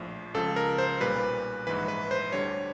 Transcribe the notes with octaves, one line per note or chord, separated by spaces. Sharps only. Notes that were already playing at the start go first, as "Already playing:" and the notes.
Already playing: A#1 A2 F3
C#2 C#3 F3 A4
A#4
C5
B1 A#2 G3 B4
A#1 G#2 E3 B4
B4
C5
D2 D3 G3 C#5